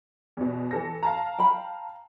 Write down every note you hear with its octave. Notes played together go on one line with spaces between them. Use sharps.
E2 B2
E3 A4 A#6
F5 A5 A#5
G5 B5